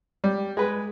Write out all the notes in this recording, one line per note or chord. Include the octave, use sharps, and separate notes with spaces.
G3
G#3 B4